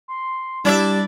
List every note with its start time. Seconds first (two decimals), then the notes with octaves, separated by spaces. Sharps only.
0.08 C6
0.65 G3 D4 E4 D5 E5